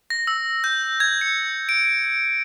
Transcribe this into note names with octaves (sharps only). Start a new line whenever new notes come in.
A#6
E6
G6
G#6
C#7
D7